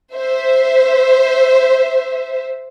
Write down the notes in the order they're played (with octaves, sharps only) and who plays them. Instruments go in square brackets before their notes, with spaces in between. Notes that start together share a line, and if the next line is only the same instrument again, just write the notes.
[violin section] C5 E5